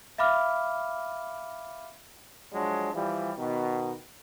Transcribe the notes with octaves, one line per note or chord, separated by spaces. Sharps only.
E5 F5 B5 D6 F6
F3 F#3 G#3 D4
E3 F3 G3
B2 D#3